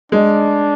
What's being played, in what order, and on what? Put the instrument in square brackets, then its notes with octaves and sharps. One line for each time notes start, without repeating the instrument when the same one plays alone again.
[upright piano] G#3 [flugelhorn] D4